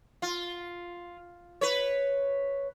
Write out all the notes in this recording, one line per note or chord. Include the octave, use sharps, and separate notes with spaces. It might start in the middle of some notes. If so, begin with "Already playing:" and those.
F4
B4 C#5